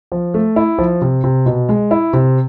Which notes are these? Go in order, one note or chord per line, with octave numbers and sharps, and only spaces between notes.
F3
A3
E4
F3
C3
C3
B2
G#3
E4
C3